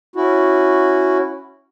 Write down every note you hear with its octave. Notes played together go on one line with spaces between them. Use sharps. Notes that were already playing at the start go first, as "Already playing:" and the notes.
C#4 E4 F#4